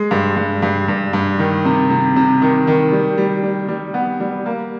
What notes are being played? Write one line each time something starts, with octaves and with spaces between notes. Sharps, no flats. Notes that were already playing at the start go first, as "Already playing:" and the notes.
Already playing: G#3
G2
G2
G2
G2
G2
D#3
C3
C3
C3
D#3
D#3
G3
G3
G3
G3
B3
G3
A#3